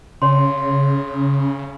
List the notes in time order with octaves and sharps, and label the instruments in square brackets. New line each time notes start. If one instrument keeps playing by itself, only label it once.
[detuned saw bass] C#3 [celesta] C#5 C6